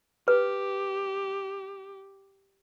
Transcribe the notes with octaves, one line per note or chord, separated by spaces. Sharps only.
G4 B4